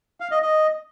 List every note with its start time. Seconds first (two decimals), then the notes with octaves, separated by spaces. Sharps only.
0.20 F5
0.31 D#5
0.42 D#5